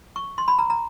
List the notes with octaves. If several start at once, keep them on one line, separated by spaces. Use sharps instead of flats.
C#6
C6
B5
A#5
A#5